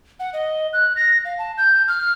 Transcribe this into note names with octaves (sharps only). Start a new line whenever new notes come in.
F#5
D#5
F#6
A#6
F5
A5
G6
F6